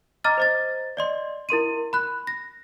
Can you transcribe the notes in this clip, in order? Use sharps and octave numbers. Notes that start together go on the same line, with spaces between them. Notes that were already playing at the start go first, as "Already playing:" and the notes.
D#5 A#5 D6 F6 A6
C5 D#5 A6
D5 D#5 C6
E4 A#4 C6 D#7
B5 F#6
A#6